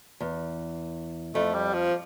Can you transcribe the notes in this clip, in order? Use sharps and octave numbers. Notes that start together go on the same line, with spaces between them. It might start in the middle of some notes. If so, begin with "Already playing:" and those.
E2
F2 A3
G3
F3